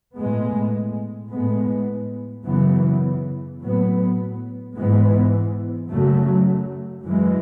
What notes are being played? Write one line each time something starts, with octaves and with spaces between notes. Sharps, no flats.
A2 G#3 B3
A2 G#3 B3
F#2 C#3 E3 B3
A2 F#3 B3
G#2 E3 G#3 B3
F#2 C#3 F#3 A3
F#2 E3 G#3